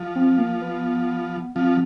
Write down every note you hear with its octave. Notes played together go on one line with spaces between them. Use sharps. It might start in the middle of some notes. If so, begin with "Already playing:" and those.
Already playing: F3
C4
A#3
B3
F3 C4